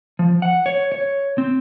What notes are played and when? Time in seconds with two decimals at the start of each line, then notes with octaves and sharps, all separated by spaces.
0.19 F3
0.42 F#5
0.66 C#5
0.92 C#5
1.38 C4